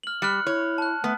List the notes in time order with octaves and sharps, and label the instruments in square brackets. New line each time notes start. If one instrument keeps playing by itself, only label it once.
[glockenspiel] F6 F#7
[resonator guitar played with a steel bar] G3 [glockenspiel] F6 F#6 C#7
[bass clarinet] E4 [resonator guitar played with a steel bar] C#5
[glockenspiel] A5 F#6
[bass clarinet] A3 [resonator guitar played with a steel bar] B3